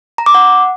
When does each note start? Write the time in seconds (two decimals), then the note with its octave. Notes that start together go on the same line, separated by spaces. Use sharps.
0.18 A#5
0.26 D6
0.34 F#5